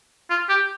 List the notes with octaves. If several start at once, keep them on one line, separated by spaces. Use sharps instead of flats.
F4
G4